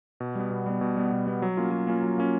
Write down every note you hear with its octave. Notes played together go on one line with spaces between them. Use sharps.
B2
G3 B3
B2
G3 B3
B2
G3 B3
B2
G3 B3
F#3
A#3 C#4 F4
F#3
A#3 C#4 F4
F#3
A#3 C#4 F4